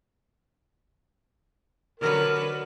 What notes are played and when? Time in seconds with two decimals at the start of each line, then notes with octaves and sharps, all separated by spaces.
2.00 D3 F#3 A#4 B4